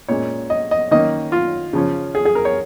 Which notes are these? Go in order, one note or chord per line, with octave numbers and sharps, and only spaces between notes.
A#2 G#3 C#4 C#5
D#5
D#5
D#3 A#3 C#4 D#5
F4
C#3 F3 C#4
G#4
G#4
A#4
C#5